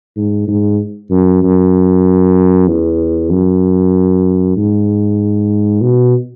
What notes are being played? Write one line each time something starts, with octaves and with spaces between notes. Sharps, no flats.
G#2
G#2
F#2
F#2
E2
F#2
G#2
B2